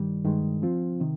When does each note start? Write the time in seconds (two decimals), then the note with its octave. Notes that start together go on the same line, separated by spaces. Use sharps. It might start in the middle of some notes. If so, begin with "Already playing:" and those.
Already playing: G2 D#3 G3
0.24 G2 D#3 G#3
0.62 F3 C4 F4
1.00 C3 D#3